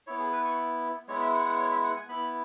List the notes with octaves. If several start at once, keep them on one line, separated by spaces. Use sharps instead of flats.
B3 E4 C#5
G#4
B4
C#6
G#3 B3 E4 C#5
E5
F#5
F#5
C#5
E5
F#5
G#5
B3 E4 B5